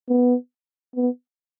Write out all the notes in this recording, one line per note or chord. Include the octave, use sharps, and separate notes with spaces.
B3
B3